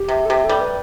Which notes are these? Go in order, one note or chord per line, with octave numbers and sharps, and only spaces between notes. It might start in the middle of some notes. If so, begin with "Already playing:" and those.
Already playing: G4
C3
A4
C3 G4
G3 A4
B4